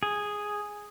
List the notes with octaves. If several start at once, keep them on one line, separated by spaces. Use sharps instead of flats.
G#4